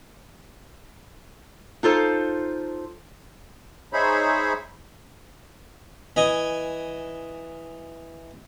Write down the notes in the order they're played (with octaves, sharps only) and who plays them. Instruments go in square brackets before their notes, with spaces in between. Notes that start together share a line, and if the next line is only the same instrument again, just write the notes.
[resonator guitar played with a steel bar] D#4 F4 A4 C5
[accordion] D#4 G#4 C5 C#5 E5 B5
[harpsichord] E3 D#5 G#5